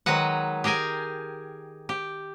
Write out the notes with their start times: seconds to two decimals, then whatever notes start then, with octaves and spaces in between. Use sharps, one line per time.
0.06 D#3 F#3 G#3 B4 F#5
0.64 G4 G#4 A#4 G5 G#5
1.89 G4